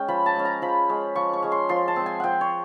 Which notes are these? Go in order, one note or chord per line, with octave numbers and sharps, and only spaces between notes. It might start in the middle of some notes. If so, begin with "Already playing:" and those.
Already playing: G#3 C#4 G5
F3 B5
A5
G#3 C#4
A#5
F3 B5
G#3 C#4
F3 C#6
C#6
G#3 C#4
C6
F3 C6
A5
G#3 C4
G#5
F3 F#5 G5
C#5